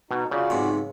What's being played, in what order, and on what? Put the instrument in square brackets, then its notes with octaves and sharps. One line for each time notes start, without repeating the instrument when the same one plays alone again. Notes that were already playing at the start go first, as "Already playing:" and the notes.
[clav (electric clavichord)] B2 [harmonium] D#4 F#4
[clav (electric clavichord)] C#3 [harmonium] F4 F#4 D5
[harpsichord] B1 G#2 C3